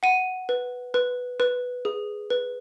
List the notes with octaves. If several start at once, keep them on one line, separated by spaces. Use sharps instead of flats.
F#5 D#7
B4
B4
B4
G#4
B4